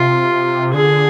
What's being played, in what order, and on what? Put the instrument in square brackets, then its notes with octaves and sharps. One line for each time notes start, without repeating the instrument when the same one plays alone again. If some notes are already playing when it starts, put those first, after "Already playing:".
Already playing: [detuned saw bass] C3 [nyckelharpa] F4
[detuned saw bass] D3 [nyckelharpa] G#4